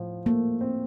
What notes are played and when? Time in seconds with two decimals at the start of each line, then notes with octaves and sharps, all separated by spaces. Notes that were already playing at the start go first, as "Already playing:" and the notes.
Already playing: A2 F3
0.26 A3 A#3
0.61 C4